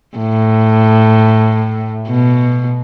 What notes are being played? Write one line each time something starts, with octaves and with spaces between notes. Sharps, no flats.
A2
B2